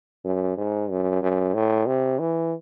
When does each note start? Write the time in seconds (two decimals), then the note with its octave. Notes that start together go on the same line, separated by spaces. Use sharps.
0.25 F#2
0.57 G#2
0.90 F#2
1.22 F#2
1.54 A2
1.86 C3
2.19 E3